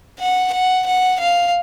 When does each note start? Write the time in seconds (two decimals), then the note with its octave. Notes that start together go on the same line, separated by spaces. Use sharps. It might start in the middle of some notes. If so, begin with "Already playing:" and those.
0.20 F#5
0.53 F#5
0.87 F#5
1.20 F5